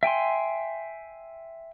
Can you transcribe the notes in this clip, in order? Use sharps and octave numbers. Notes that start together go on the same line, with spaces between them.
E5 G5 G#5 C6